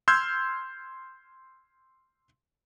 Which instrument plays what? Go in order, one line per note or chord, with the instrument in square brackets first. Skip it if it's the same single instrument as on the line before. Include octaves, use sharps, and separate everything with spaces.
[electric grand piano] C6 E6 F6 G6 G#6